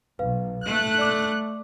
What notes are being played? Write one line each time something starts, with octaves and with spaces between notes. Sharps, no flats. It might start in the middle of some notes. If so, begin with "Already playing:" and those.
B1 B4 F5
A3 F#6
D5 D6